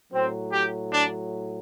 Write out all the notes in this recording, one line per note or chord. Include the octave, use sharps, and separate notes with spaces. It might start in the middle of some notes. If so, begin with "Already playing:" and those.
A2 F#3 C4
G4
D4